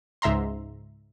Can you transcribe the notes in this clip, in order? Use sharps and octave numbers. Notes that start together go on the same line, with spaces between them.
C#2 G#2 E5 A#5 C6